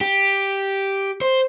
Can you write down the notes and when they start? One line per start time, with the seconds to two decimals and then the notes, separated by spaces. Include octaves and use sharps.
0.01 G4
1.21 C5